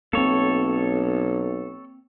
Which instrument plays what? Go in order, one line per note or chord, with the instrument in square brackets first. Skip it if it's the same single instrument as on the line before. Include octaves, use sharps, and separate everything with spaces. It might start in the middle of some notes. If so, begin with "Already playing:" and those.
[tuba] B1 [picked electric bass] A#3 C4 [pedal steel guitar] A4 C#5